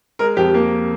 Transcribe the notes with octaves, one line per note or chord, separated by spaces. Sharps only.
G#3 A#4
F2 G4
A#3